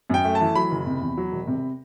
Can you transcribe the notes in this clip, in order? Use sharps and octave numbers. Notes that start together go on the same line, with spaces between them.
F#2 G5
A3
A5
E3
F#3 B5
F#1
C3
E2
F#3
E1
C3